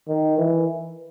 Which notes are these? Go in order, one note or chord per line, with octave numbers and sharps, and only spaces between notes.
D#3
E3